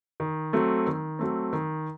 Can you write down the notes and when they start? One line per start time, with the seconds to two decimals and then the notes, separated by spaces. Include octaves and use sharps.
0.20 D#3
0.53 F#3 A3 C4
0.87 D#3
1.19 F#3 A3 C4
1.53 D#3